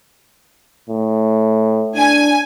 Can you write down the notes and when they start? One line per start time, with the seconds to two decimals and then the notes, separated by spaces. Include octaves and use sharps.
0.89 A2
1.96 D4 G#5